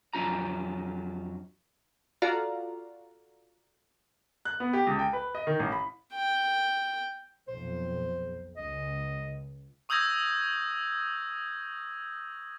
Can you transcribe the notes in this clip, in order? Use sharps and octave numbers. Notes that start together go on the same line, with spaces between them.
F2 F#3 D4 F4 A#5
F4 F#4 A4 D5 F5 A#5
F#6
B3
G4
C#2
G5
B4
D#5
D#3
A1
B5
G5
B1 F2 C5
C#2 D#5
C#6 D#6 E6 G6 G#6 A#6